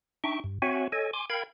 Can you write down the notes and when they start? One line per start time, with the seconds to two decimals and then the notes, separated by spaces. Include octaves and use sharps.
0.24 D4 D#4 E5 G5 C#6
0.44 G2
0.62 C4 F#4 C#5 E5 F#5 G#5
0.92 A4 C#5 D#5 G#5
1.13 G#5 C6 D6
1.30 A#4 F5 G5 B5 G#6